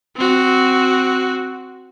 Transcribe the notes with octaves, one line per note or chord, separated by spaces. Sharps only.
C4 F#4